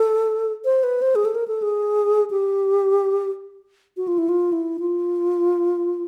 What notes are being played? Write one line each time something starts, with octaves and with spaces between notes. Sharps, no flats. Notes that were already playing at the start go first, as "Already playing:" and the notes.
Already playing: A4
C5
B4
C5
G#4
A4
A#4
A4
G#4
G4
F#4
F4
E4
F4
E4
F4